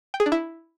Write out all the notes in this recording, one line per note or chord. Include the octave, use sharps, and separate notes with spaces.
G5
G#4
D4
E4